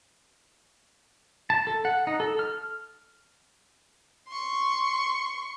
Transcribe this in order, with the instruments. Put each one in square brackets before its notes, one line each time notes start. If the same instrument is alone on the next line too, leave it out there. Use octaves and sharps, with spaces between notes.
[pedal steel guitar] A5
A4
F#5
D#4
A4
F6
[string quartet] C6 C#6